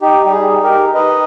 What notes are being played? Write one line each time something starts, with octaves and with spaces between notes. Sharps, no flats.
D#4 G4
G3 G4
G#4
D#4
G4 A#4
D#4
D#4 B4 D#5